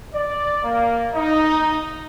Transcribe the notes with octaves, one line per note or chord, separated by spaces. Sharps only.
D5
A#3
D#4